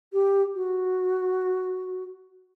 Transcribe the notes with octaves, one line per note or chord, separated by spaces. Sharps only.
G4
F#4